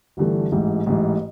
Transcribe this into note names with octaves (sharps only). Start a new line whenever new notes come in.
G1 G2 E3 A3
A1 G#2 E3
A1 G#2 E3